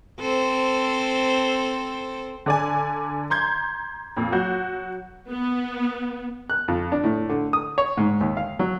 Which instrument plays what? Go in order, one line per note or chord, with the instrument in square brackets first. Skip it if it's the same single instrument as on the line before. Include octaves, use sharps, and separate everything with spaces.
[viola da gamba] C4 A4 C5
[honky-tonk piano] D3 D5 G#5
A#5 C6 G6 G#6
F2 A#2
F#3 F#4 G6
[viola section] B3
[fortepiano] F#6
F2
D4
A2
D3
D#6
C#5
G#2
D#2
F5
F#3